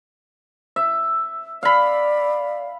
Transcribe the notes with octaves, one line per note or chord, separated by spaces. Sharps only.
E5
D5 F5 B5